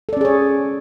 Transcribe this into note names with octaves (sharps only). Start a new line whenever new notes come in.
C#4 G#4 A4 C#5 D5